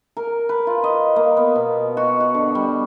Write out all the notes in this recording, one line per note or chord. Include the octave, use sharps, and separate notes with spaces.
A#4
B4
F4
D#5
A#3
B3
B2
F#4
F#4
D3
G3